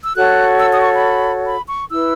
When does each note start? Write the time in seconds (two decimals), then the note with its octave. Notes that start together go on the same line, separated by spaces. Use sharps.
0.04 E6
0.16 F#4 A4 C#5 F#6
0.60 E6
0.71 D#6
0.81 C#6
0.93 B5
1.46 B5
1.68 C#6
1.90 E4 B4 E6